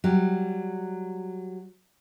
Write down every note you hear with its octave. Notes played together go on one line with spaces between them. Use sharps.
F#3 G3